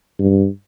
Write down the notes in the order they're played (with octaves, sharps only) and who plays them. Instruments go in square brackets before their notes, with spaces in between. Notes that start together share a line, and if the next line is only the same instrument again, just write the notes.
[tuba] G2